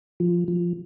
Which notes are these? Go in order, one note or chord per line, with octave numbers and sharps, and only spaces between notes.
F3
F3